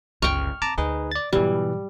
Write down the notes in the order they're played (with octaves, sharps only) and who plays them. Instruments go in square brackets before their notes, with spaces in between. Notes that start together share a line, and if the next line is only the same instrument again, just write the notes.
[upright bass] G1 C#2 [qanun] G5 C#6 [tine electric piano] F6
[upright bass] C4 [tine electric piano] A5 A#5 D6
[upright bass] D2 [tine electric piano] D#4 G#4 B4
[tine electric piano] D5 A6
[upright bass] G#2 F#3 [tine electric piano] B2 E3 [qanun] G3